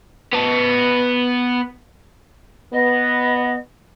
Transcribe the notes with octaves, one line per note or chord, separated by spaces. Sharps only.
B3 A5
B3 D#5